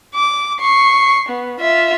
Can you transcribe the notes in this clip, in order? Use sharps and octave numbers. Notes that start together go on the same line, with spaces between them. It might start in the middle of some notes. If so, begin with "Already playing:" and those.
D6
C#6 C7
B3
F4 E5